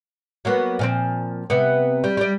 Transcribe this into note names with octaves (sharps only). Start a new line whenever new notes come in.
F#3 A#3 B3
A#2 F3 C4
C3 B3
G3
G3 D5